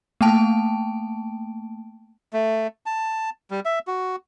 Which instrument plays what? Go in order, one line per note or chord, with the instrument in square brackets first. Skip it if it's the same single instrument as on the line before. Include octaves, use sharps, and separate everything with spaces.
[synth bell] A3 A#3 G5 A5 D7
[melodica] A3
A5
G3
E5
F#4